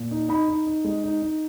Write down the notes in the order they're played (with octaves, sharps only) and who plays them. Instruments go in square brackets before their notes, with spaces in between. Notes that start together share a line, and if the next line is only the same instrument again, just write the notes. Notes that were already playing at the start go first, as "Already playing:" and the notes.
Already playing: [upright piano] A#2
D#4
D#4 B5
D#4
D#4
G#3
D#4
D#4